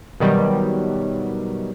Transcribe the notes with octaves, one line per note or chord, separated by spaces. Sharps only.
B2 D#3 F#3 G3